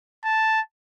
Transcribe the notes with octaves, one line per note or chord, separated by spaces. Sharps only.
A5